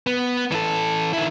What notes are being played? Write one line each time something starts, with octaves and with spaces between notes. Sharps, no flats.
B3
E3 A4
D#3 E4